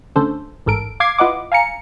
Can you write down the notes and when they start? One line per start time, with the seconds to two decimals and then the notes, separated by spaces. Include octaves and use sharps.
0.16 D3 A3 C#4 D4 A4 C5
0.66 A1 G#2 A4 A#4 D7
1.00 F5 D6 G#6 C7
1.18 E4 F4 B4 D#5 F#5 D6
1.52 F5 G#5 A#5 C#7